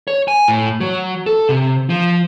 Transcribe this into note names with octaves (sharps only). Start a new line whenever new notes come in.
C#5
G#5
A2
F#3
A4
C3
F3